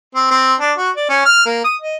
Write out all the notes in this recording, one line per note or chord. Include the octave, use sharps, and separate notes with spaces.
C4
C4
D4
F#4
D5
C#4
F6
A#3
D#6
D#5